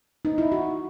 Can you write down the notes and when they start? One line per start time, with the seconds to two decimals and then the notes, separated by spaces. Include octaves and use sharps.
0.25 D#4
0.38 E4
0.52 F#4